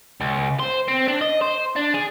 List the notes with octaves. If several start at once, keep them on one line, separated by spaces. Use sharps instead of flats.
C#2
C5
C4
D4
D#5
C5
D4
G#4